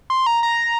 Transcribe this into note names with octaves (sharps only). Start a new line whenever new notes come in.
C6
A#5
A#5